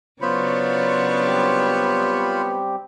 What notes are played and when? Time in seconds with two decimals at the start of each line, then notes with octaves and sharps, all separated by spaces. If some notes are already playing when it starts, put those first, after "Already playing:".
0.21 C#3 F#3 B3 D4 F4 C5 C#5 B5
1.25 G3 C4 G4